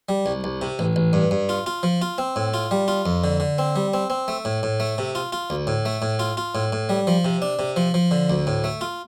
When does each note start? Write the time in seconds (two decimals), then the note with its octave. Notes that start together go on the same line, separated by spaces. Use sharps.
0.09 G3
0.26 C2
0.44 C2
0.62 C3
0.79 A1
0.96 A1
1.13 G2
1.31 G2
1.49 F4
1.66 F4
1.83 F3
2.02 F4
2.18 C4
2.36 A2
2.54 F4
2.71 G3
2.88 F4
3.06 F2
3.24 D3
3.40 D3
3.58 C4
3.76 G3
3.94 C4
4.10 C4
4.28 A3
4.45 A2
4.63 A2
4.80 A3
4.98 C3
5.15 F4
5.32 F4
5.50 D2
5.67 A2
5.86 A3
6.02 A2
6.19 F4
6.37 F4
6.55 A2
6.72 A2
6.89 G3
7.07 F3
7.25 C3
7.42 D4
7.59 C3
7.76 F3
7.94 F3
8.11 D3
8.30 D2
8.47 A2
8.64 A3
8.81 F4